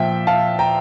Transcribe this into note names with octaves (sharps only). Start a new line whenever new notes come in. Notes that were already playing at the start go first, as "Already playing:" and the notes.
Already playing: A#2 F3 E5 G5
F5 A5
G5 A#5